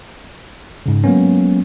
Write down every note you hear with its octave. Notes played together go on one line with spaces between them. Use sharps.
G#2 C#3
F#3 G#3 A#3 B3 C#4